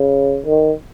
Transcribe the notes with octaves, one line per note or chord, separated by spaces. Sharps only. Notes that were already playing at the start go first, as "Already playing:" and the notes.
Already playing: C#3
D#3